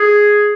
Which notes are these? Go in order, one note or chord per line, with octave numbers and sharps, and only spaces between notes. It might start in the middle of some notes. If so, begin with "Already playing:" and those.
Already playing: G#4